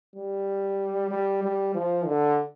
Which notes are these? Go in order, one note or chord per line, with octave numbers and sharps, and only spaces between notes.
G3
G3
G3
F3
D3